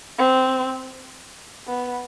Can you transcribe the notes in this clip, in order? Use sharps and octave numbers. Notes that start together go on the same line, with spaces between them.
C4
B3